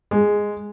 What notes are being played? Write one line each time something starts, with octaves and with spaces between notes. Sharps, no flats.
G#3